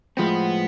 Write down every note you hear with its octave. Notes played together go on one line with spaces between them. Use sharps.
A2 F3 G#3 B3 C4